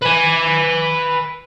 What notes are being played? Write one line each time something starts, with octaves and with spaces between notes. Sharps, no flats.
B4 G#5